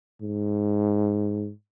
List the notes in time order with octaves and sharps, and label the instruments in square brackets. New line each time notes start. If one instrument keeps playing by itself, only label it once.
[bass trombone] G#2